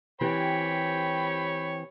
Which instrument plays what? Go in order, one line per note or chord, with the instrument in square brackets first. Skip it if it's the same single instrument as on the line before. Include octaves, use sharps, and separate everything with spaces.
[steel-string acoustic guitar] E3 C4 G4 [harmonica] C#5 G5 B5